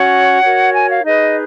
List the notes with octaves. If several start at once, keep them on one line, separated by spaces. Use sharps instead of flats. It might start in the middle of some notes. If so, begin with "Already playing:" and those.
Already playing: C#4 F#4 C#5 F#5
F#4 A#4 C#5
G#5
F5
D#4 G#4 B4 D#5